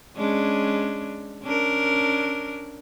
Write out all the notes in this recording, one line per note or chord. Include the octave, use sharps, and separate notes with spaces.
G#3 C#4 D4
C#4 D4 A#4